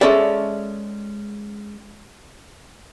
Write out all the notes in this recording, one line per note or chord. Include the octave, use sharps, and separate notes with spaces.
G#3 C#4 A4 D5 E5